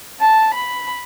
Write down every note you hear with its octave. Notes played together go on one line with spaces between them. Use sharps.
A5
B5